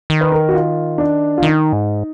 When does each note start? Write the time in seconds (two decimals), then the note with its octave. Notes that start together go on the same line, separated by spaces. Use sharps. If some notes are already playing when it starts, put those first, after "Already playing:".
0.10 D#3
0.21 B4
0.32 A#4
0.49 F#4
0.54 F4
0.98 D4
1.38 F4
1.42 D#3 D#4
1.73 G#2